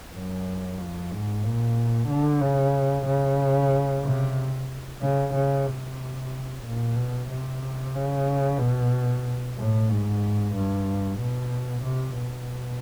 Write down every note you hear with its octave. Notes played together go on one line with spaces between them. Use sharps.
F#2
F2
G#2
A#2
D3
C#3
C#3
C3
C#3
C#3
C3
A#2
B2
C3
C#3
B2
A2
G#2
G2
B2
C3
B2